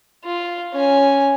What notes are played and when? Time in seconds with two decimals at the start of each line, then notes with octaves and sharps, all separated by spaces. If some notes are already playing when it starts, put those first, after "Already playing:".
0.24 F4
0.72 C#4 G#5